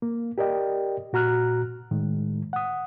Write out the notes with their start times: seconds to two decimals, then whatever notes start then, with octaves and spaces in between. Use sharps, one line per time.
0.02 A#3
0.38 G4 A#4 D5 D#5 G5
1.13 A#2 F#4 A#5 F6 F#6
1.91 A2 D#3 G#3
2.53 F#5 D#6